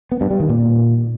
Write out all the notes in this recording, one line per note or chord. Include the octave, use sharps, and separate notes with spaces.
B3
G2
G3
D#3
A#2